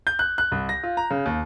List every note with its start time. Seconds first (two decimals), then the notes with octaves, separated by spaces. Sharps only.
0.07 G6
0.19 F#6
0.38 F#6
0.52 C2
0.69 A#6
0.83 F4
0.97 A#5
1.11 C#3
1.26 D#2